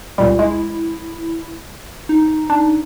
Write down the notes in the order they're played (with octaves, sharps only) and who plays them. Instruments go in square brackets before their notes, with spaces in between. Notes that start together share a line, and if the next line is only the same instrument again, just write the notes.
[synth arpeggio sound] C#2 A#2 G3
[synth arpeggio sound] G#3 [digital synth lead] E4
[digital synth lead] D#4
[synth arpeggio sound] D4